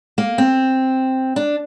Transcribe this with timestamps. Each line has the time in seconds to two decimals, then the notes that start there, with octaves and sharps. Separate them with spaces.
0.18 A#3
0.38 C4
1.36 D4